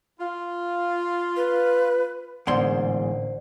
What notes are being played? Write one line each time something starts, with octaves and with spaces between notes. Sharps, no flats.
F4
B4
A1 E2 G#2 D3 A#3 C5 D5 C6